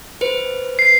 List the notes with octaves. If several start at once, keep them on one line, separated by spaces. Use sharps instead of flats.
B4 C5
C7